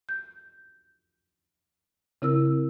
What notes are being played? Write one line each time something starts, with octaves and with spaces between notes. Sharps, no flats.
G6
C#3 C4 E4 A#4 E6